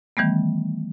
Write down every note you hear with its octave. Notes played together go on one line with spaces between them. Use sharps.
D#3 E3 G3 A3 B3